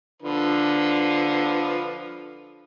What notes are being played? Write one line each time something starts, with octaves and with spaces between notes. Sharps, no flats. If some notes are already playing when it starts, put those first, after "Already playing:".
D3 F3 B4